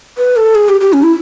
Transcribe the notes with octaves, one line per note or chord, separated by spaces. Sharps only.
B4
A4
G#4
G4
G4
C#4
E4